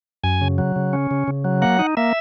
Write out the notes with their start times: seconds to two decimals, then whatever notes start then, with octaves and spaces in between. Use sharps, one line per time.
0.24 F#2 G#5
0.41 C#3
0.58 F#3
0.76 C#3
0.93 C#4
1.11 C#3
1.28 C#3
1.44 F#3
1.62 A#3 F#5
1.79 D#4
1.97 A#3 E5